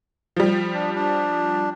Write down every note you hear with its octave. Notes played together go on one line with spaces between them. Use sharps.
F3 G3
D4
D4